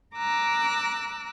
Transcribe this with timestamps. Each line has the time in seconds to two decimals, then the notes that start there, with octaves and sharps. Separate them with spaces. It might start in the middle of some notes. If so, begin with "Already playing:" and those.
0.14 A#5 D6 E6 F#6